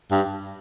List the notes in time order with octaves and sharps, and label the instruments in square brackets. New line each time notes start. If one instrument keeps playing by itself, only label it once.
[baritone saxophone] G2